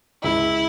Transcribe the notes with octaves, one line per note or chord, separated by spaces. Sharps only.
C#2 E4